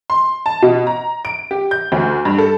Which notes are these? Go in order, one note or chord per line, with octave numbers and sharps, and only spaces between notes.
C6
A5
B2
A#5
D7
G4
G6
D2
G2
A4